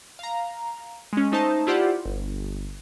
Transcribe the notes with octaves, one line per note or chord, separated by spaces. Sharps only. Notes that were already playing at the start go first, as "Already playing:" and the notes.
F5 A#5
G#3 C#4
A3 D#4 C5 A5
E4 F4 G4 C5 D5 F#5
G1